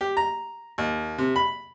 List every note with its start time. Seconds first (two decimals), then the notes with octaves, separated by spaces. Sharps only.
0.01 G4
0.17 A#5
0.78 D#2
1.18 C3
1.36 B5